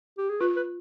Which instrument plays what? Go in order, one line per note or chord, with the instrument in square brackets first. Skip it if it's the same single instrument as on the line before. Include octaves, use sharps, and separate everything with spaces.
[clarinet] G4
G#4
[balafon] F4 [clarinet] B4
[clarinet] B4